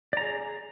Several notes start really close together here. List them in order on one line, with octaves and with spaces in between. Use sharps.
D5 A#5 G#4